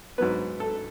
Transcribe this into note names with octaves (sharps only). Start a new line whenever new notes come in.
G#2 F#3 B3 B4
A4